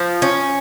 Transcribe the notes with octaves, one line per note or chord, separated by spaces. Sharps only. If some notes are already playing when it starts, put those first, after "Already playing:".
Already playing: F3
C#4